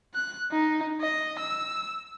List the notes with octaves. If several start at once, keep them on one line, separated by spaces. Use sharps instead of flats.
F#6
D#4
D#5
E6